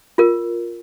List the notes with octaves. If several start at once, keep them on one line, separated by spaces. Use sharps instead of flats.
F4 A#4